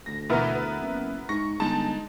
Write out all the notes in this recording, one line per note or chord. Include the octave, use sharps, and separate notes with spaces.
D2 A#6
B2 E3 B3 E4 A#4
B4
F#1
G#2 C#6 A#6
G1 G#3 D#4 A5